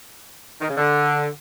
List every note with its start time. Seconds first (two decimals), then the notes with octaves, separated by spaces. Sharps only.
0.61 D#3
0.69 C#3
0.78 D3